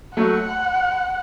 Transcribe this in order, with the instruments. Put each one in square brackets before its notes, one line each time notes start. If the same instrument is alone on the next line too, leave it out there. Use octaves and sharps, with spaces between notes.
[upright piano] F#3 A3 [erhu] F#5